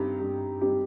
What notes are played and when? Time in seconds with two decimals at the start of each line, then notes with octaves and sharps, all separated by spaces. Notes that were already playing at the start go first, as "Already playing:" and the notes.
Already playing: G2 G3 C4 D#4 G4
0.20 G2
0.61 G3 C4 D#4 G4